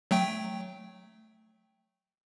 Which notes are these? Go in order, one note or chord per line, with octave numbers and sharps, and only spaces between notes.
F#3 A3 G5